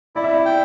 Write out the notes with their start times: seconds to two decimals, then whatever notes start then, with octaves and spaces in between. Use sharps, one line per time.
0.16 E4 D5
0.24 E5
0.33 D5
0.45 G5